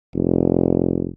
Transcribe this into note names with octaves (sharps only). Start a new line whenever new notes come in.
F1